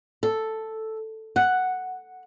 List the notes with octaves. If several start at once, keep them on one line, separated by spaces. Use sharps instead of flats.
A4
F#5